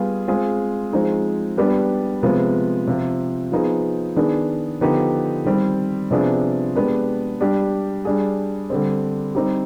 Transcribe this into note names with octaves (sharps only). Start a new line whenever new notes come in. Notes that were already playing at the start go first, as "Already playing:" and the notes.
Already playing: G3 B3 F4 G#4
G#3 C4 F4 G#4
F3 G#3 C4 D#4 G#4
G3 B3 D4 G4
C3 F3 G#3 B3
C3 F3 C4
F3 B3 D#4 G#4
D#3 B3 D4 G#4
D3 F3 B3 D#4 G4
D#3 G3 C4
C3 F3 B3 D4 G#4
G#3 B3 D4 G4
G3 D4 G4
G3 D4 G#4
D3 G3 C4
G3 C4 D#4 G4